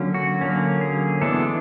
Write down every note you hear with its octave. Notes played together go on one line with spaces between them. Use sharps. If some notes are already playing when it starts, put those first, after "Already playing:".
Already playing: D3 F#3 A#3 C#4
F#4
D3 F#3 A#3 C#4
G#4
E3 G#3 B3 D4 A4